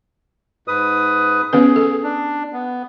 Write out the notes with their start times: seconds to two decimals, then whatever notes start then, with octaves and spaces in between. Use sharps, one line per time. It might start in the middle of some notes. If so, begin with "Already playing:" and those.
0.68 G#2 B4 D#6
1.53 B3 C#4 G#4 B4
1.76 A4
2.03 D4
2.53 B3